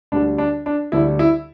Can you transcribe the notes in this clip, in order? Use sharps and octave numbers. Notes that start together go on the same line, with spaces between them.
D2 D3 G3 D4
D4
D4
D2 D3 G3 E4
E4